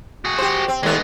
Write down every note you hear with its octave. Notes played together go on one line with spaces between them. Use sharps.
F#4 G#4
G4 C5
C4
D#2 G#3 A3 B3